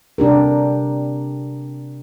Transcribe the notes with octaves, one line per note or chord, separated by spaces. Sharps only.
C3 D4 G4 A#4